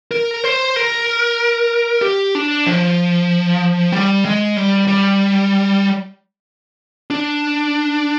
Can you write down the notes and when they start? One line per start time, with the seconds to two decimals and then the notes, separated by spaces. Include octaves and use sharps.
0.11 A#4
0.44 C5
0.76 A#4
2.02 G4
2.35 D4
2.67 F3
3.92 G3
4.25 G#3
4.57 G3
4.88 G3
7.10 D4